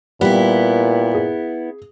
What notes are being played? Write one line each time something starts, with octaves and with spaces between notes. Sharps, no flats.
A#2 G3 B3 E4
G#4